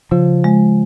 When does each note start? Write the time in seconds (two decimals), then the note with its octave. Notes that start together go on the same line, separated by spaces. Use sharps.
0.11 C#3 F3
0.44 G#3